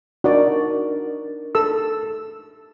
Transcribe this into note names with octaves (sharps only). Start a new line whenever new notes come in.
D4 D#4 F#4 A#4 D5
A4 E6